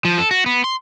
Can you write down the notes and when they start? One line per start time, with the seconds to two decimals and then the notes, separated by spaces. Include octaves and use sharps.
0.05 F3
0.18 A4
0.31 F#4
0.46 B3
0.64 C6